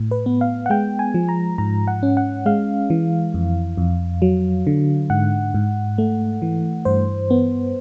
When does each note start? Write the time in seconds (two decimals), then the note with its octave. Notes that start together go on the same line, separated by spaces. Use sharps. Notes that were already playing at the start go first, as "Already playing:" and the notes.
Already playing: A2
0.11 B4
0.26 B3
0.41 F5
0.66 F#5
0.70 G#3 G5
0.99 G#5
1.14 F3
1.29 A#5
1.58 G#2 A#5
1.88 F#5
2.03 C#4
2.17 F#5
2.46 G#3 F5
2.90 E3
3.34 F2
3.77 F2
4.22 F#3
4.67 D3
5.10 G#2 F#5
5.55 G#2
5.98 A3
6.42 E3
6.85 G2 C5
7.30 B3